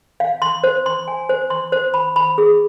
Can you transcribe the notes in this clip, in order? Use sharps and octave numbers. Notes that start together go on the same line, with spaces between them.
F5
C6
C5
C6
G#5
C5
C6
C5
B5
B5
G#4